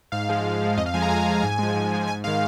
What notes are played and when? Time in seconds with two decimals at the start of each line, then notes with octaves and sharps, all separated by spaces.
0.12 G#2 F5
0.29 F3 G#3
0.45 G#2
0.62 F3 G#3
0.77 F2 D#5
0.86 F5
0.94 F3 G#3 G#5
1.02 A#5
1.10 F2 G#5
1.26 F3 G#3
1.42 G#2 G#5
1.59 F3 G#3
1.76 G#2
1.92 F3 G#3
2.08 G#2 G#5
2.24 D#3 G#3 F5